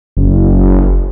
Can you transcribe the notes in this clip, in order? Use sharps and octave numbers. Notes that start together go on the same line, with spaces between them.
F#1